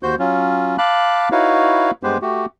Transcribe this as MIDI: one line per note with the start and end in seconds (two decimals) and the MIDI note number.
0.03 0.15 39
0.03 0.15 66
0.03 0.15 72
0.03 0.15 91
0.19 0.77 54
0.19 0.77 61
0.19 0.77 65
0.78 1.29 77
0.78 1.29 81
0.78 1.29 83
0.78 1.29 86
0.78 1.29 90
1.32 1.91 63
1.32 1.91 64
1.32 1.91 66
1.32 1.91 71
1.32 1.91 73
1.32 1.91 77
2.03 2.18 43
2.03 2.18 56
2.03 2.18 59
2.03 2.18 67
2.03 2.18 71
2.03 2.18 72
2.22 2.46 57
2.22 2.46 66
2.22 2.46 67